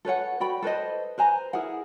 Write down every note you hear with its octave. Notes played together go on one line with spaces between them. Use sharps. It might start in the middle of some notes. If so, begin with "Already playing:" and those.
A4 B4 C#5 F#5
F#4 D5 G5 B5
A4 B4 C5 D#5
B4 C5 G#5 A#5
E4 G#4 A#4 F#5